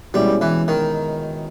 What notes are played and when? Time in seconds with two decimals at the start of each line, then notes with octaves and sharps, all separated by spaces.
0.14 B2 G3 G#3 C#4 E4
0.41 E3
0.68 D#3